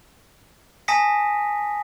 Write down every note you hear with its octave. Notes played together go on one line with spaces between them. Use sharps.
G#5 A5 D#6 A#6 B6 C#7